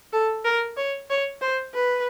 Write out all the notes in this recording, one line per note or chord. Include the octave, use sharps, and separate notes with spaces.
A4
A#4
C#5
C#5
C5
B4